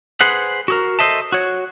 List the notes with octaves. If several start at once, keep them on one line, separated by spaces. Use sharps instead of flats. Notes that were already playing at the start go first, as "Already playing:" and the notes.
G#4 B4 C5 F#5
F#4 G#4 A#4
A4 B4 C5 D#5 E5 A5
F#4 C#5